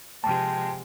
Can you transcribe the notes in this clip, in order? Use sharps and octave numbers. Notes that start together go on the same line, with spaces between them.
C3 F3 G#3 G5 A5